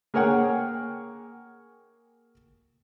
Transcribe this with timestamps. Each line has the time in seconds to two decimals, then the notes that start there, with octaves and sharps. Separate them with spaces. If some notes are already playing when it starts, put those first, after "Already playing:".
0.14 A#3 G#4 A#4 C#5 F#5 G5